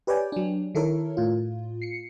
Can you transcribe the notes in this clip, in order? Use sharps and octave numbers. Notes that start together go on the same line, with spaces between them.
G4 B4 C#5 D5 G5 G#5
F#3 D4
D#3 E4 A4 A#4 C#5
A2 F4
C7 C#7